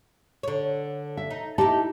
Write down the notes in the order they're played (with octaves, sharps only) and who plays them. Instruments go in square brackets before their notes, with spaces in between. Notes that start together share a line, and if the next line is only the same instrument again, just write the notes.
[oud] D3 C#5
[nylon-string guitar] E5
[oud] D#4
[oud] D#4 E4 [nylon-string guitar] G4 A5